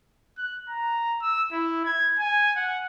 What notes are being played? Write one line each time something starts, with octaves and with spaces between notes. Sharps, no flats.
F#6
A#5
E6
E4
G#6
G#5
F#5